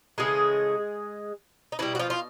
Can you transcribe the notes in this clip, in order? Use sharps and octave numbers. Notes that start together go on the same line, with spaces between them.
C#3 E3 G#3 A3 G#4
D#4
B2 E3 G3 E4
F#4
F3 F4
F4